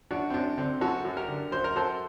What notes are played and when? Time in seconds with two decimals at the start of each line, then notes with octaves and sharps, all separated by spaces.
0.11 F#2 D4 F#4
0.30 C4
0.34 F#2 D4
0.58 D3 C4
0.81 F#2 F#4 A4
1.05 F#2
1.16 G4 A#4
1.28 D3
1.51 F#2 C5
1.64 A#4
1.75 F#2 A4 C5